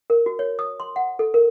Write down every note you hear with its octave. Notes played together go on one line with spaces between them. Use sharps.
A#4
F#4
C#5
D#6
C6
F#5
A4
A#4